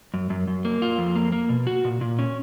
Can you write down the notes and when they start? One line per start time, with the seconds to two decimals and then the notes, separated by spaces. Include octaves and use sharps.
0.14 F#2
0.30 F#2
0.47 F#2
0.65 A#3
0.82 F4
0.98 F2
1.16 A#3
1.32 A#3
1.49 B2
1.67 F#4
1.84 A#2
2.01 A#2
2.19 C#4